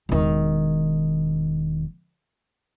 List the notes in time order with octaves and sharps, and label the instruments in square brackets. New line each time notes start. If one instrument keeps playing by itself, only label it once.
[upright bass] E1 D#3